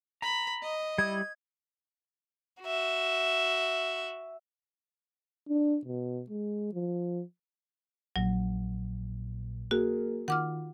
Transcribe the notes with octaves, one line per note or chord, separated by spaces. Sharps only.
A#5 B5
D#5
G3 E4 D#6 G#6
F#4 E5
D4
B2
G#3
F3
A#1 A#2 F#3
A#3 F#4 G#4 A#4
D#3 F4 F#5 D6 F6